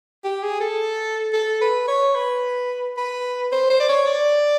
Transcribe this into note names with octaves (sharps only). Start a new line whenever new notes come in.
G4
G#4
A4
A4
B4
C#5
B4
B4
C5
C5
D5
C#5
D5